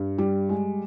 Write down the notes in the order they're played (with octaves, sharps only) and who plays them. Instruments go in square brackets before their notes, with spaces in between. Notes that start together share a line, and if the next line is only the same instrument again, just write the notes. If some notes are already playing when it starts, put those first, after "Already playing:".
Already playing: [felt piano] G2
G3
G#3